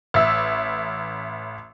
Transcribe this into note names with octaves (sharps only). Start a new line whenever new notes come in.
A1 E5 E6